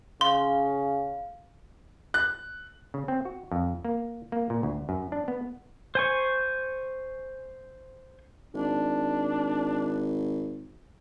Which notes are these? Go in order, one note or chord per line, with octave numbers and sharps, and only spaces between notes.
C#3 F5 C6
F#6
C#3
C4
F#4
F2
A#3
A#3
A#2
D2
F#2
D4
B3
C5 G#5 C#6
G#1 D4